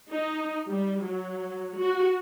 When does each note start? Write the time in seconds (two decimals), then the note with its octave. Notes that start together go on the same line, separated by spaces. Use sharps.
0.11 D#4
0.67 G3
1.04 F#3
1.77 F#4